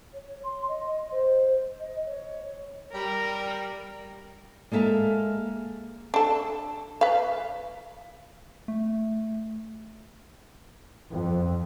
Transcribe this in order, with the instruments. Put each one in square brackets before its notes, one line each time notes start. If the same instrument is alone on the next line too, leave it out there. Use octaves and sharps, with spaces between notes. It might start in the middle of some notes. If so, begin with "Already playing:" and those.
[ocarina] C#5
C6
D#5
C5
D#5
C#5
[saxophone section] G3 [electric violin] A#4
[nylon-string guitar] G#3 A#3 A4 E5 F5
[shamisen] D4 A4
B4 F5
[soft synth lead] A3
[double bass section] F2